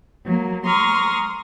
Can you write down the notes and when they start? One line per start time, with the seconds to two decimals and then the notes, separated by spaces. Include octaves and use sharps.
0.25 F#3 A#3
0.66 A#5 C6 C#6 D#6 F6